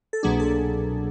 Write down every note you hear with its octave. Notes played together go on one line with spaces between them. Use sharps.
A4
C2 B2 F#3 A#3 D4 G#4
A4